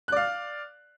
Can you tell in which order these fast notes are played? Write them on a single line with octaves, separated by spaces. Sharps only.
F#6 D5 F5